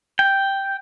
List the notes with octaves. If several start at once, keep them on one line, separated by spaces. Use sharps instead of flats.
G5